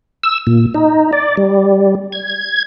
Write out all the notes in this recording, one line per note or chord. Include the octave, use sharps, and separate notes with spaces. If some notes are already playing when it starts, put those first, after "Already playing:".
E6
A#2
D#4
D5
G3
G#6